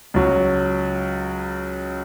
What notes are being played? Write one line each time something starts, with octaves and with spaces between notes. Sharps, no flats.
C#2 F#3